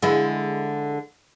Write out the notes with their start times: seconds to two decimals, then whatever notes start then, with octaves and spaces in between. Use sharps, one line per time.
0.02 D3 G#3 E4